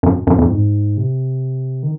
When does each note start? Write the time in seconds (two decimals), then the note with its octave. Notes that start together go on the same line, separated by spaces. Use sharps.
0.03 F#2
0.27 F#2
0.38 F2
0.51 G#2
0.97 C3
1.83 D#3